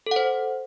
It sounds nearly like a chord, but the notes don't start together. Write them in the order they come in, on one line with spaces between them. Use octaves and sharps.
A4 F#5 C5